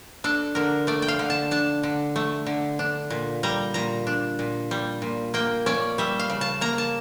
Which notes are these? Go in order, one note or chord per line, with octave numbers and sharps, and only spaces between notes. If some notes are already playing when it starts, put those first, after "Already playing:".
D4 A4
D3 A#4
A3 D5
G5
F5
D3
A5
D4 A5
D3
A3
D3
D4
A#2
G3 A#5
A#2 A#5
D4
A#2
G3
A#2
A#3 G5
C#4 D5
G3 E5
F5
C#3
A5
A#3 A#5
A5